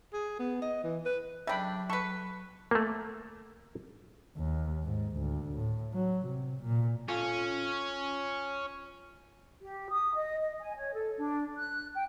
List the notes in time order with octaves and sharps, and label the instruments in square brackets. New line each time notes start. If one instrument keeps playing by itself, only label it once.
[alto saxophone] G#4
B3
D#5
E3
B4
[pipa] C#3 D4 [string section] F#3 [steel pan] E5 G5 B5
[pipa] A4 B4 [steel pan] C#6
[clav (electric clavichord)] A3 A#3
[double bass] D#2
G#2
D2
A2
F#3
C3
A#2
[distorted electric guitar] C#4 [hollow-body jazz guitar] F4 A4 C#5
[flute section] G4
D#6
D#5
D#5
G#5
C#5
A4
D4
F#6
G5